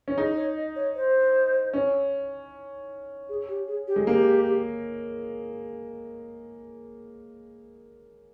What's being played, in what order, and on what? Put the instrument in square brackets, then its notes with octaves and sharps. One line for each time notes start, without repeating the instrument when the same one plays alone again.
[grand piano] C#4
[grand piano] D#4 [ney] G#4
[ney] C#5
D#5
C#5
C5
[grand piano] C#4
[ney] G#4
G4
G#4
G4
[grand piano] G#3
[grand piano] A#3 [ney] G4